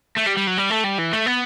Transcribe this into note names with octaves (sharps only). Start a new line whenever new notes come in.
A3
G3
G3
F#3
G3
A3
G3
E3
A3
B3